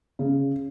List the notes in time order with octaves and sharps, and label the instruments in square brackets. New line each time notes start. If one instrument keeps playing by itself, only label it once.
[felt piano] C#3